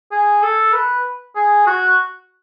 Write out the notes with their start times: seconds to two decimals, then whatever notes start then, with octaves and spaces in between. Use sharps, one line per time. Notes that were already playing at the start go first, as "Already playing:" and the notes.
0.11 G#4
0.42 A4
0.73 B4
1.35 G#4
1.66 F#4